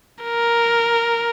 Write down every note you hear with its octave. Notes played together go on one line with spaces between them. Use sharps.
A#4